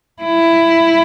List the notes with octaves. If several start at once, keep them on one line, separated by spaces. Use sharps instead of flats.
E4